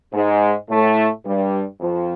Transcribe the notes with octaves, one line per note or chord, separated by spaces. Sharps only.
G#2 G#3
A2 A3
G2 G3
F2 F3